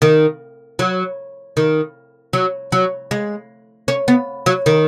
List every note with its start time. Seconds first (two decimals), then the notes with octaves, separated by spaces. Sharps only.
0.02 D#3
0.79 F#3
1.57 D#3
2.33 F#3
2.72 F#3
3.11 G#3
3.88 C#4
4.08 B3
4.46 F#3
4.66 D#3